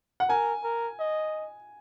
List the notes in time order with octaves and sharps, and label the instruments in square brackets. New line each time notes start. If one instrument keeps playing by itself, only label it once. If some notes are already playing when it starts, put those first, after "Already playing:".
[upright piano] F#5
[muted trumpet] A#4 [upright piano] G#5
[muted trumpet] A#4
D#5